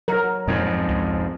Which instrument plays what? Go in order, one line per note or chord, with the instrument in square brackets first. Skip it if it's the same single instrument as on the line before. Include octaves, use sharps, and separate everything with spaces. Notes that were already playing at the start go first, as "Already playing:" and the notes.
[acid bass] F#3 [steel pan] A#4
[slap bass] F2 G#2
[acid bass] C#2